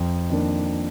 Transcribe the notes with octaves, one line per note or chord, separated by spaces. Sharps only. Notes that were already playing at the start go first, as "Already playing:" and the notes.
Already playing: F2
D#3 A#3 D4